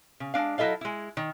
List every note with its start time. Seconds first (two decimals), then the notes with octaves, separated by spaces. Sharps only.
0.20 C#3
0.34 G#3 D4 F5
0.58 F#3 E4 A4 D#5 F5
0.81 G#3 E4
1.17 D#3